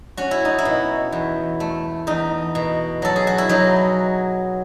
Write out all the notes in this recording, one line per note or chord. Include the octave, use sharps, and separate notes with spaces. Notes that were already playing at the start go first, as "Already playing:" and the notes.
C#4 F#4
E4
D#4
E4
B2
E2
A3
E2 D#4
B2
F#3 A4
G#4
F#4
E4
F#3 D#4